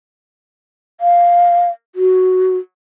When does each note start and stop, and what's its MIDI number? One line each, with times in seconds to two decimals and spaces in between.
1.01 1.69 77
1.95 2.57 66